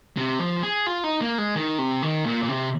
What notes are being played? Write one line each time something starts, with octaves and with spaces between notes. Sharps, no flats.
C3
F3
G#4
F4
D#4
A#3
G#3
D#3
C3
D#3
A#2
A#2
C3